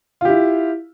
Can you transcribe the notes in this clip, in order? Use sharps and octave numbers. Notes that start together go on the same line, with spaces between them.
E4 F4 G4